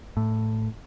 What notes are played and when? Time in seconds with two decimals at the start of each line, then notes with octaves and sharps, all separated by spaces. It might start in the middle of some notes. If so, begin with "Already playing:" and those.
0.17 A2